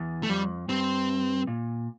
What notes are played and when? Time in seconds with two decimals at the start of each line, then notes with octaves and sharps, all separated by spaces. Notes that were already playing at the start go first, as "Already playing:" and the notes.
Already playing: E2
0.23 A3
0.29 F2 G3
0.69 G2 C4
1.47 A#2